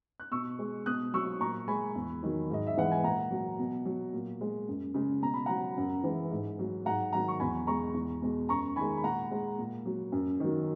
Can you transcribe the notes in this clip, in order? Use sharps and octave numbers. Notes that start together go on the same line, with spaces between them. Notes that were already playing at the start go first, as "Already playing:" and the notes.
F#6
B2 C#6 E6
G#3
B2 D#6 F#6
F#3 C#6 E6
A#2 A#5 C#6
G#3 G#5 B5
E2
D#3 F#3
G#2 D#5
E5
E3 G#3 F#5
G#5
A#2 F#5 A#5
F#3
B2
F#3
A#2
G#3
F#2
C#3 G#3
B2 A#5
B5
F#3 F#5 A#5
F#2
E3 G#3
G#2
F#3
G#2 F#5 A#5
D#3 F#3 F#5 A#5
C#6
E2 G#5 B5
B2 G#3 A#5 C#6
E2
B2 G#3
F#2 A#5 C#6
D#3 G#5 B5
G#3
B5
A#2 F#5 A#5
G#3
A#2
F#3
F#2
D#3 F#3